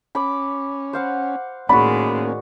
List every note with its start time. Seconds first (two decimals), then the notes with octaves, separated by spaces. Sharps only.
0.15 C#4 B5 D6
0.93 C5 F5 F#5
1.69 A2 D#3 G#3 A#3 C#4 F#4 D5 B5